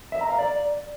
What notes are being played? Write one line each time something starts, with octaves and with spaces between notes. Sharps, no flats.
E5
A#5
F5
D5